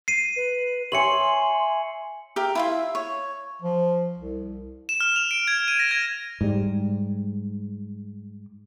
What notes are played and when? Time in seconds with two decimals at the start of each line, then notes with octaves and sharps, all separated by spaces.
0.08 C7 D#7
0.36 B4
0.92 C#5 E5 G#5 C6 C#7 F#7
2.36 G4 A#4 E5
2.55 E4 F4 E5
2.95 C#5
3.62 F3
4.17 C2
4.89 E7
5.00 F6
5.16 F7
5.31 D7
5.48 G#6
5.68 D#7
5.79 A#6
5.91 G#6
6.41 G#2 G3